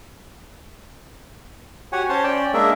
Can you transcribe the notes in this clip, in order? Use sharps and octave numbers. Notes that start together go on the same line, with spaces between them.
F#4 G4 C#5 F#5 G#5
C#4 C5 C#5 A5 C6
C#4 D5 G5
G#3 A#3 D4 G#4 A#4 E5